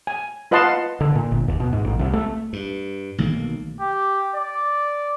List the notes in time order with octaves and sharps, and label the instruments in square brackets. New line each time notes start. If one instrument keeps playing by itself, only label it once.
[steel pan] G#5
F4 B4 D#5 F#5 A5 C6
[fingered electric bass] D3
A#2
G1
D#2
B2
G#2
A1
C2
A3
[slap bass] G2
B1 D#3 A3 A#3
[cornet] G4
D5